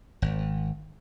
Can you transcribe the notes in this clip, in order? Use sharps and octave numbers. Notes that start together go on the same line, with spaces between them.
G#1